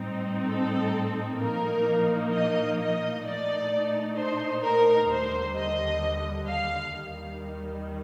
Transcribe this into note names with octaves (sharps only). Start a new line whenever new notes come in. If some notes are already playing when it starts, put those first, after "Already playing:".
Already playing: A2 G3 C4 D#4
A4
A#2 F3 A#3 D#4 A#4
D#5
D#5
A#2 A3 D#4 D5
C5
A#4
D#2 D3 G3 C5
D#5
F5
D#2 D#3 G3